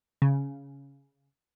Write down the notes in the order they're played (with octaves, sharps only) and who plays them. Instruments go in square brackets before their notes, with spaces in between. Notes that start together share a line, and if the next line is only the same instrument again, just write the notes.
[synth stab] C#3